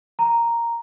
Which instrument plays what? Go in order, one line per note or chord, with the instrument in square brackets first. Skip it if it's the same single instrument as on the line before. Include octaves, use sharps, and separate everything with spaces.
[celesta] A#5